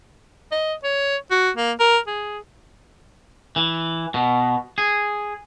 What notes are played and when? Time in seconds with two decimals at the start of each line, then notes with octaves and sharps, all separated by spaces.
0.52 D#5
0.84 C#5
1.31 F#4
1.57 A#3
1.80 A#4
2.07 G#4
3.56 E3
4.14 B2
4.78 G#4